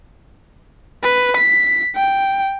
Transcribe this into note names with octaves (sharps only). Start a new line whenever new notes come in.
B4
B6
G5